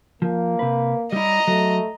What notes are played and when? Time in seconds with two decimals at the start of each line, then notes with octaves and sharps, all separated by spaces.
0.22 F3 A#3
0.59 C3 B4
1.12 G3 E4 D#5 A#5
1.47 F#3 A3